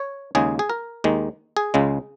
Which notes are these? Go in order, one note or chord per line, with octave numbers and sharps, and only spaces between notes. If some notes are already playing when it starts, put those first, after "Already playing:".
Already playing: C#5
D#2 C#3 G#3 G#4
G#4
A#4
D#2 D#3 G#3
G#4
C#2 C#3 G#3